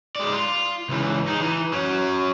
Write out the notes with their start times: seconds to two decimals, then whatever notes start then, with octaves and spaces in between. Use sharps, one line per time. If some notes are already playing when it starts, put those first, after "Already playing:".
0.16 G#3 D5
0.33 F4
0.89 C#2 E3
1.27 D#4 G#4
1.41 E3
1.73 F#3 C#4